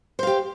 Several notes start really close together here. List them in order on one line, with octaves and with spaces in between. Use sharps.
C5 F5 G4